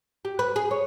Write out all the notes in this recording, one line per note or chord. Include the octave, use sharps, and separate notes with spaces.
G4
B4
G#4
C#5